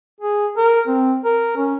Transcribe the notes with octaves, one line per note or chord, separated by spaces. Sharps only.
G#4
A#4
C4
A#4
C#4